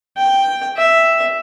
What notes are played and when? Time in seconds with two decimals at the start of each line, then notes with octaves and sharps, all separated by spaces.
0.17 G5
0.77 E5